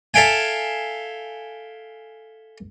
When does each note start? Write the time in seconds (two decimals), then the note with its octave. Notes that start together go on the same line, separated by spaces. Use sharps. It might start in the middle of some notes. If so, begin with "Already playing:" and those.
0.14 A4 E5 F5 G5 G#5